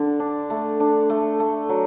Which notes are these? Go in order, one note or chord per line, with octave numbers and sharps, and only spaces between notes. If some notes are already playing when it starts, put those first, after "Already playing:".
Already playing: D3
D4
A3
D4
A3
A3
F#3